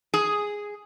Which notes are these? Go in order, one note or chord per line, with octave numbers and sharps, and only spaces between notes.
G#4